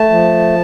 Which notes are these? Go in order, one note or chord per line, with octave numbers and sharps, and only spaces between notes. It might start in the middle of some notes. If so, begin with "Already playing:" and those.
Already playing: A3 A5
F3